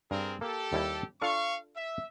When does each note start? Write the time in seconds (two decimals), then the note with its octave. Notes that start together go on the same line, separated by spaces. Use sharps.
0.11 G2 C4 G#4 A#4
0.41 A#3 G4 A4
0.73 D#2 G3 E4
1.22 D4 F4 A4 F5 C#6
1.76 E5